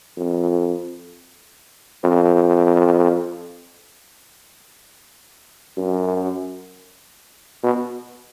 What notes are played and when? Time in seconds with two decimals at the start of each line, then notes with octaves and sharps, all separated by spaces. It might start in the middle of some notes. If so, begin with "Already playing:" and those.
0.18 F2
2.04 F2
5.78 F#2
7.63 B2